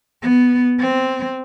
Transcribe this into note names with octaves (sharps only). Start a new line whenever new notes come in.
B3
C4